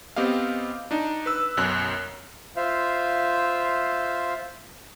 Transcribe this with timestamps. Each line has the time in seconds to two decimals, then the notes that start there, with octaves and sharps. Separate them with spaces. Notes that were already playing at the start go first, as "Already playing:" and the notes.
0.16 B3 C4 G4 D#5 F5
0.91 D4 D#4
1.26 B4 E6
1.57 B1 F#2 F#6
2.56 F4 C5 E5 F5